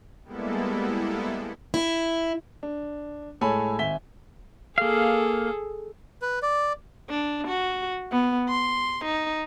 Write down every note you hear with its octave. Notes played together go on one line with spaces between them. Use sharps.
G3 G#3 A#3 B3 E4 A4
E4
D4
A2 G#3 A4 C#5 G#5 B5
G#1 E5 G#5 B6 G7
A#3 G#4 A4 F5
B4
D5
D4
F#4
B3
C6
D#4